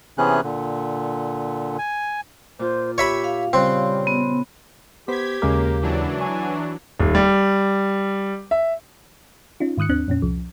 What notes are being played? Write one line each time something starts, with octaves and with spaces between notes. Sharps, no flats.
C3 E3 B3 C#4 G#4 F#6
A#2 D3
G#5
A#2 F4 C5
G4 C#5 E5 B5
F5
C#3 G3 C4 C6 F#6
B3
B3 G4 C5 G#6 B6
D#2 C#3 G#3 A#3 A#4 D6
E3 F#3 D4
G#5 C#6
D#1
G3
E5
C#4 D#4 F4
G#2 D#3 D#6 F#6 C#7
D#2 C4 D4 F#6
F2 A#2 C#4
C2 F3